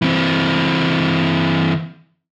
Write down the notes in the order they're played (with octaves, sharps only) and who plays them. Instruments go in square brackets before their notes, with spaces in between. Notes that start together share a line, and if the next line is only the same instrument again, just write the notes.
[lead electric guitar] E3 C4